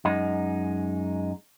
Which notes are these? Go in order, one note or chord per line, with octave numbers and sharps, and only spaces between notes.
F#2 G#3 D#4